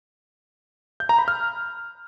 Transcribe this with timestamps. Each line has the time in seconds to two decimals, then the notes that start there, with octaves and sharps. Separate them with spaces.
1.00 G6
1.09 A#5
1.19 B5
1.28 F6